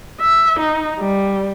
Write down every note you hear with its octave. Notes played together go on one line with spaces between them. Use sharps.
E5
D#4
G3